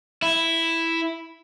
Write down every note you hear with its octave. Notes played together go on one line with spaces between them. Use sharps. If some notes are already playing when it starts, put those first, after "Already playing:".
E4